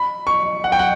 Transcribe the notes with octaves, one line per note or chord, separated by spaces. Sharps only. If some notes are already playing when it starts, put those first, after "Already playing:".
Already playing: B5
C#6
F#5
G5
F#5